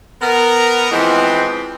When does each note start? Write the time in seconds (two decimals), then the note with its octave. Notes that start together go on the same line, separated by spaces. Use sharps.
0.22 B3 A#4
0.92 E3 F3 G#3 B3 C4